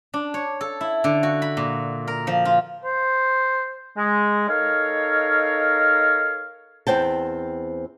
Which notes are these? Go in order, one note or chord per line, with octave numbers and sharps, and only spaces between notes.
D4
C#5
A4
E4
D3
F#4
B5
A#2
A#4
F3
F4
C5
G#3
D#4 A4 A#4 C#5 F5
E2 C4 G5 A5